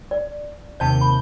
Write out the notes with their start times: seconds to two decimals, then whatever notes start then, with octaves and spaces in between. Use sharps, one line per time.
0.11 D5
0.80 D#2 C3 D#5 A5 G6
1.01 B5